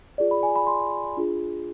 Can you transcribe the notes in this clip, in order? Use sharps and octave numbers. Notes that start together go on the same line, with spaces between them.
F4 G#4 D5
B5
G#5
B5
C6
D4 F4 G#4